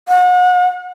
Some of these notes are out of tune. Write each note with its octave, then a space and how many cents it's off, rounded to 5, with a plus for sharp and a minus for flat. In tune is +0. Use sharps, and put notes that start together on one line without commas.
F#5 -35